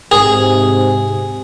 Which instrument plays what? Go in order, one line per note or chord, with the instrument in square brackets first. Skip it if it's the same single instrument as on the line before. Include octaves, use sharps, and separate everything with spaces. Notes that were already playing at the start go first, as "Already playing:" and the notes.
[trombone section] G#2 C3 [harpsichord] G#4